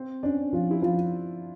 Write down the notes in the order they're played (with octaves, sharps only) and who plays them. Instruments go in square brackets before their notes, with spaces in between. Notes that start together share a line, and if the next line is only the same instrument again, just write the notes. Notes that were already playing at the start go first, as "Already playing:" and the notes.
Already playing: [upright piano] C4
[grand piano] C#4 [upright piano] D4
[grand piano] F3 [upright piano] F4
[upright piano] E4
[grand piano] F3 [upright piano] F4